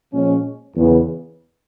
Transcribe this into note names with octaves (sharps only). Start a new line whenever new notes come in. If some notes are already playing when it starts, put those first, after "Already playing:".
A#2 F3 G#3 C#4
E2 C#3 E3